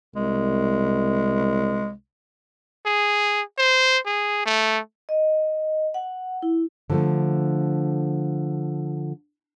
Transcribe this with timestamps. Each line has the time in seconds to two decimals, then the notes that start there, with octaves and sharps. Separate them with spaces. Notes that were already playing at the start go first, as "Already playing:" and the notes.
0.16 C2 G#3
2.86 G#4
3.58 C5
4.06 G#4
4.46 A3
5.09 D#5
5.94 F#5
6.42 E4
6.90 D3 F3 A3